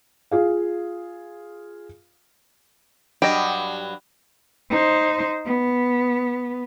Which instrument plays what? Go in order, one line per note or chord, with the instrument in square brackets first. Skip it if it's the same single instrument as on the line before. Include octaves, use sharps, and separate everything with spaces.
[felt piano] F4 G#4 F5
[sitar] G2 F#3 [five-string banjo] G4 D#5
[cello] D#4 C5
B3